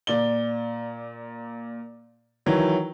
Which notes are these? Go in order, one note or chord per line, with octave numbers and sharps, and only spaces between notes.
A#2 D5 G7
D#3 E3 F#3 E4